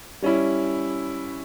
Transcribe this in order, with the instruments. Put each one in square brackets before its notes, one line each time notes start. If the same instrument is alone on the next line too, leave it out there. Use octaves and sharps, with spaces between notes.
[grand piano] G3 C#4 E4